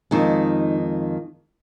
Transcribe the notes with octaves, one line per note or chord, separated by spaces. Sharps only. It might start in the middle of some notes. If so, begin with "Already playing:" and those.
F2 D#3 G#3 D#4